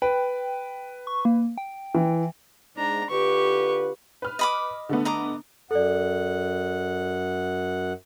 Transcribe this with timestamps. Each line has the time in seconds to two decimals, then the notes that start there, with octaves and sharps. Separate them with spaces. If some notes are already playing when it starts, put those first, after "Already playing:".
0.02 B4 G5
1.07 C#6
1.25 A#3
1.58 G5
1.95 E3
2.77 G#2 D4 A#5
3.10 D3 F4 G4 B4 C#6
4.22 B4 F6
4.39 D#5 B5 D6
4.89 D3 A3 B3
5.05 D#5 A#5 D6
5.71 F#2 A4 D5 F#5